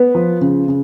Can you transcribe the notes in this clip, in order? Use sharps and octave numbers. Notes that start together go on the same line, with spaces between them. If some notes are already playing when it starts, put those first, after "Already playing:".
Already playing: B3 B4
F3
C#3
C#3